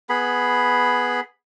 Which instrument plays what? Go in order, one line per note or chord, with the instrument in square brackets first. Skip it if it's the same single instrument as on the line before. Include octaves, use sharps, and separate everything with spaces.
[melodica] B3 G#4 B5